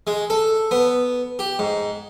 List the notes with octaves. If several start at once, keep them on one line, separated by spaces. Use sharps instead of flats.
G#3
A4
B3
G4
G#2